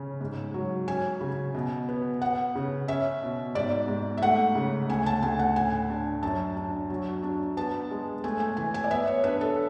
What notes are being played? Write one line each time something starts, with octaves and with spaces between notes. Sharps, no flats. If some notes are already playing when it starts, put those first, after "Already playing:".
Already playing: C#3 C#4
G#2
F#3
C#4 G#5
C#3
B2
B3
B3 F#5
C#3
C#4 E5
B2
G#2 D5
G#2
E5
A3 F#5
C#3
D2 G#5
A5
D2 G#5
F#5
A2 G#5
D4
F#2 A5
D4
F#3
D4
B3 A5
G#3
A3 G#5
G#5
E3 G#5
G#5
D5
B3 E5
C#5
D4 B4
A4